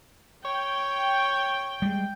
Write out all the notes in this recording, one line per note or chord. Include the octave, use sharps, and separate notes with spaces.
C#5 G5
G3 G#3